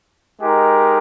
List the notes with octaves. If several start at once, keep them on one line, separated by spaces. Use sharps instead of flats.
G#3 D#4 G4 A#4